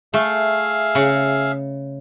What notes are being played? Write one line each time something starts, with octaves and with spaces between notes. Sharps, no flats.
A3 G#4 E5 F5
C#3